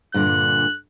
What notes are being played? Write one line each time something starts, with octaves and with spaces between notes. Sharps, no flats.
G2 A#2 D3 F#6